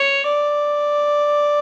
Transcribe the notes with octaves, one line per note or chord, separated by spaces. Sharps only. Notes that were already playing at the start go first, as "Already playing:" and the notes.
Already playing: C#5
D5